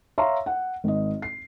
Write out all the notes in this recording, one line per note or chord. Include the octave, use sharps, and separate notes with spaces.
C#5 E5 F5 A#5 C6
F#5
G#1 D#5
C7